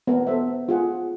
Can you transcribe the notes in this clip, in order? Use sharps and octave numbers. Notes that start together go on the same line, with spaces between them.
B3 A#4
A4 C5 E5
F4 G#4 F#5